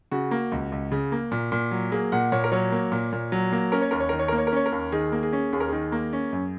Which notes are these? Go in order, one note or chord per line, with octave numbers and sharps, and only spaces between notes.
C#3 F#4
A#3
C#2
C#2
C#3
A#3
A#2
A#2
F#3
A#3 G#4
A#2 F#5
A#2 C#5
A#4
F#3 C#5
A#3
A#2
A#2
F#3
A#3
C#4 A#4
C#5
D#2 A#4
C#5
D#3 A#4
C#5
A#3 A#4
C#5
A#4
C#4 C#5
A#4
D#2
D#3 G#4
A#3
G#4
C#4
D#2 G#4
A#4
D#3 G#4
A#3
C#4
F#2